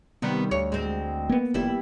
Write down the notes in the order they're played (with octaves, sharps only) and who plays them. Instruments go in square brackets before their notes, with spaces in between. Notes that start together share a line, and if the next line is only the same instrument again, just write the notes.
[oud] C3 D#3 G3 [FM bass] B3
[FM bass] D2 [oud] C#5
[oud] G#3 C4
[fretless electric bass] A#3 B3
[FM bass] F1 [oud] G3 E4